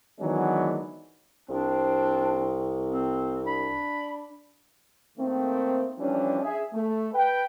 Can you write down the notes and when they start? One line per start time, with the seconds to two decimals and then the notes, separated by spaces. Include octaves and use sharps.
0.20 D#3 E3 F#3 G#3 B3 D4
1.50 C2 C4 D4
2.88 C4
3.47 D4 B5
5.18 D#3 A3 A#3 C4
5.99 E3 F3 G3 C#4 D4
6.43 G#4 E5
6.73 A3
7.14 B4 G5